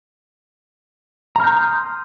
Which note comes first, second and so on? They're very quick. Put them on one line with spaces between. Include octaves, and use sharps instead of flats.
A#5 F6 G6 C6 D#6